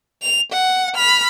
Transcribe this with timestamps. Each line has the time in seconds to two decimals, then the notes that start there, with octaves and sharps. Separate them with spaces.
0.22 F7
0.52 F#5
0.95 B5 F6